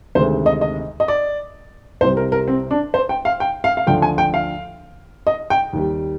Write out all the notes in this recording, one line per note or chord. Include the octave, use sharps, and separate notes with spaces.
D2 C3 D#3 G#3 C5
D#5
D#5
D#5
D5
C2 C3 G3 C5
A#4
A#4
C4
D4
C5
G5
F5
G5
F5
F5
D2 D3 F3 G5
G#5
G5
F5
D#5
G5
D#2 D#3 G3